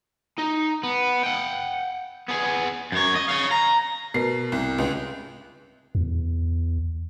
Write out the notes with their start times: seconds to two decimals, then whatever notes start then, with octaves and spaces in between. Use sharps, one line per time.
0.39 D#4
0.83 B3
1.23 F#5 G5
2.29 B3 G#4
2.92 F#2 C#5
3.15 D#5
3.29 C#5 F5
3.51 A#5
4.14 B2 A#4 C7
4.52 C2
4.78 C#2
5.95 E2